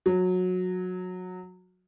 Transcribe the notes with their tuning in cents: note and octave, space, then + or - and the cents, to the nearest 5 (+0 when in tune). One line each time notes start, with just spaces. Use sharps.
F#3 -20